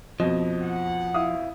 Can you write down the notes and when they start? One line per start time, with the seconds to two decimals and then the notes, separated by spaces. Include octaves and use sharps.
0.20 F2 B2 F3 D#5
0.62 F#5
1.14 E4 F5 D#6